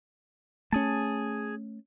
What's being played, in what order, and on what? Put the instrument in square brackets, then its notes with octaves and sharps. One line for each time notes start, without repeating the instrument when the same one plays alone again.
[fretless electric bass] A3 C#4 [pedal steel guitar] G#4 A5